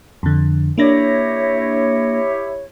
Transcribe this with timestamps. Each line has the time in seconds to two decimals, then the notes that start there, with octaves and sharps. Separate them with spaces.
0.23 F2 D3
0.78 A#3 D4 E4 G4 C#5 A#6